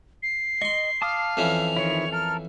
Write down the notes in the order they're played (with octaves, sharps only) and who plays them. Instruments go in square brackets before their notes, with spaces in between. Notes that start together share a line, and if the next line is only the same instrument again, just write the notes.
[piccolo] C7
[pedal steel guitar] D#5 [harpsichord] C6 C#6
[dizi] F5 [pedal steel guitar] A5 D6 D#6
[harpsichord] F2 E3 C#4 [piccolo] F7
[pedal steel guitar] D#3 F3 E4 [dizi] C#5
[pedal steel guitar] A4 A#4 [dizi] F6